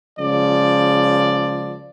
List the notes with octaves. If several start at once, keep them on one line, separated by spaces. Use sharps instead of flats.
C#2 C#3 F3 D5